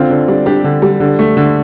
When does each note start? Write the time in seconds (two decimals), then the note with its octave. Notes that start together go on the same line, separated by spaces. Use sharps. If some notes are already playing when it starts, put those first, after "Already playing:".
Already playing: D3 C4 F4
0.10 D3 D4
0.28 G3 D4
0.46 G3 D4 G4
0.64 D3
0.82 G3
1.00 D3
1.19 A3
1.37 D3